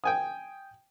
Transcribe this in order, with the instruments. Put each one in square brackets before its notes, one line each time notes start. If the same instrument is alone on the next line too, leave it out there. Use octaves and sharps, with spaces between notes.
[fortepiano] G5 G#5 D#6